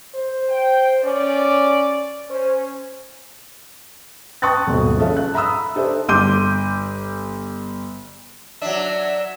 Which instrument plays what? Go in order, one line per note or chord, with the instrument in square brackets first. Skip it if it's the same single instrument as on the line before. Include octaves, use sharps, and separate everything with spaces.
[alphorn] C5
[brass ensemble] G5
[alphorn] C#4 [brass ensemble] D5
[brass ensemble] C#4 [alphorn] C5
[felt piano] G5 A5 C#6 D#6 F#6 A6
D#1 G#1 B2
F3 C#4 G#4 A4 E5 F5
F#6
E5 A#5 B5 D#6 E6
D4 G4 A4 C5 E5
G1 C6 D6 G6 D#7
[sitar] F#3 D4 [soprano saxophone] E5